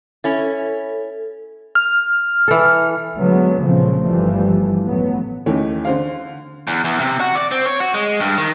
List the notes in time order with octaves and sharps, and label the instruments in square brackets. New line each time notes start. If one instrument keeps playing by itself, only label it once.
[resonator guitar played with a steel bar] C#4 E4 [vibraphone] A4
[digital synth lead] F6
[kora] E3 A4
[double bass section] D3 F#3 G#3 B3
A#2 C#3 F3 G#3 A3 C4
G1 E3 F3 G3 A3
A1 F#3 A3 B3
[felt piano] D#2 D#3 E3 A3 C#4
D3 C5 F5
[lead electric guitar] E2
E2
C3
F#4
D5
C4
C#5
F#4
G#3
G2
D#3